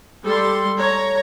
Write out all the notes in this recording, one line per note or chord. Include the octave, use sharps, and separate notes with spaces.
G3 A4 C6
C#5 A#5